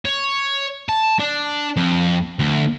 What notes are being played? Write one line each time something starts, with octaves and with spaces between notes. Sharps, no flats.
C#5
A5
D4
F2
D2